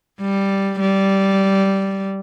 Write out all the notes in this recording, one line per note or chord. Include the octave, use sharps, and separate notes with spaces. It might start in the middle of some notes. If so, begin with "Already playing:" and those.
G3
G3